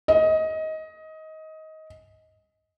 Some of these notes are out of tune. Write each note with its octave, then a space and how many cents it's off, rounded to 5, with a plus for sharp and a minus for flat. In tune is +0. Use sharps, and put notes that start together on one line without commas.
D#5 +20